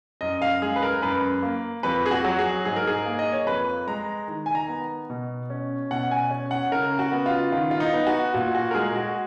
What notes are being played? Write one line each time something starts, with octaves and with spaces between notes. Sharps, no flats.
F#2 D#5
F5
G#3 G#4
B4
A#4
F#2 B4
A#3
F2 B4
G#4
F#4
F#3
G#4
G#2 G#4
A#4
G#4
A#3
D#5
C#5
F2 B4
G#3 A#5
D#3
G#5
A#5
B3
B2
C#4
B2 F#5
G#5
C#4
F#5
C#3 A#4
F#4
B3
F4
D#3 F4
F4
D#4
B3
F#4
A#2 F#4
F#4
A#4
G#3 G#4
F#4